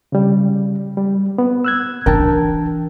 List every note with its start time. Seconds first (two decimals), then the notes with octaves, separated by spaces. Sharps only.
0.12 C#3 G3
0.97 G3
1.38 B3
1.65 E6 F#6 G#6
2.06 E3 D4 A#4 G5 A5